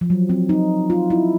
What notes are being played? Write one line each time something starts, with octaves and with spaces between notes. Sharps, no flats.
F3
F#3
C4
D#4
F4
E4